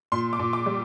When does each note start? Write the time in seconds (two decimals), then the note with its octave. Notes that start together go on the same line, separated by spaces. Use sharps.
0.12 A#2 C6
0.33 D6
0.39 A#2
0.53 D6
0.66 G3